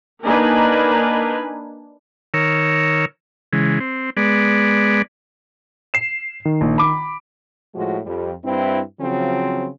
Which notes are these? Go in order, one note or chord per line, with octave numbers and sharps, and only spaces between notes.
A#3 D4 D#4 A#4 B4 G#5
D#3 A#4 C#5 E6
C#3 E3 G#3
C4
G#3 B3 D5
C7 E7
D#3
A#1
B5 D6
A2 F3 G#3 F#4
F2 G3
G2 C4 E4
C#3 F3 F#3 C4